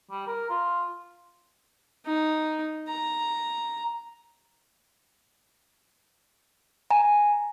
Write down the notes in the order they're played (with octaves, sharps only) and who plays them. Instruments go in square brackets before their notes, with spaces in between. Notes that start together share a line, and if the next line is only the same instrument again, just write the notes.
[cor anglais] G3
A#4
F4
[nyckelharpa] D#4
A#5
[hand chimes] G#5 A#5